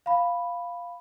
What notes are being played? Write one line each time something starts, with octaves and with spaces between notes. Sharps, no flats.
F5 B5